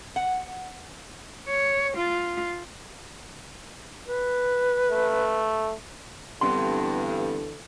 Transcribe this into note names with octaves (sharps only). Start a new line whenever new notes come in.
F#5
C#5
F4
B4
A3
G2 D3 E3 G3 B3 C4 A4 C6